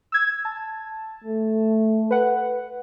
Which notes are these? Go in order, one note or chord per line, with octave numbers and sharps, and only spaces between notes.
E6 G#6
A5
A3
B4 F#5